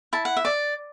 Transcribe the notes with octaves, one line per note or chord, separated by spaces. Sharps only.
E4 A5
F#5
E5
D5